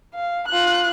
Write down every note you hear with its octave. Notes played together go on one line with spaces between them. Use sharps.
F5
F4 F#6